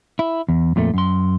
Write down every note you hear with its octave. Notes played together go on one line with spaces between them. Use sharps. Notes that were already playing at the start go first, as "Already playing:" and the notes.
E4
E2
F2 A#2 A3
F#2 C6